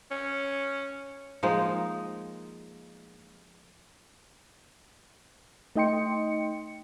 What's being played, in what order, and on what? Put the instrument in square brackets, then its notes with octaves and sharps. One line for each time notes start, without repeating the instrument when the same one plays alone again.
[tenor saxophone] C#4
[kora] F3 G#3 A#3 D#4
[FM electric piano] A3 D#4 D#5 G5 C6 C#7